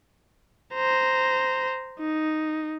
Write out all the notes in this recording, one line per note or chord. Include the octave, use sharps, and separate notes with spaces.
C5 A#5
D#4